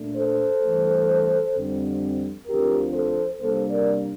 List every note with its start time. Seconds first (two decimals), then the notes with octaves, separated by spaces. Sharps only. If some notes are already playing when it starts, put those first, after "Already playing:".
Already playing: A#2 A3 D4
0.17 A4 C5
0.62 G2 E3 A3
1.55 F2 D3 G3 C4
2.47 D2 D3 F3 C4 G4 A#4
2.93 A4 C5
3.40 C3 G3 A#3 D4 A4 C5
3.70 A#4 D5